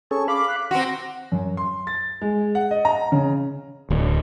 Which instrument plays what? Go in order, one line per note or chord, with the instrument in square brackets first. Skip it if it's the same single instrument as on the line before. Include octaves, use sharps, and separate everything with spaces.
[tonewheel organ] C#4 G#4 A4 [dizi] C#6
[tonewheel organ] F5 B5 [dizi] D6
[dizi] F#6
[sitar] C4 F#4 [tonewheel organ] A#5 [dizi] C6
[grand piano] F#2
C6
A6
G#3
F#5
D#5
A#5
C#3
[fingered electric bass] D1